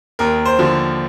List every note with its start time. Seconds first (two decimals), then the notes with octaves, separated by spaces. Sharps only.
0.19 D#2 A#4
0.45 C5
0.59 D3 F3